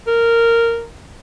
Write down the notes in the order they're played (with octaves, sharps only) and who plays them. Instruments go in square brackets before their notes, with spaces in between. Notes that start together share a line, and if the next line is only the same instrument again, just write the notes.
[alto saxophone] A#4